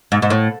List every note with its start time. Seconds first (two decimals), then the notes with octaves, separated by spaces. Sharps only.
0.12 G#2
0.22 G#2
0.30 A2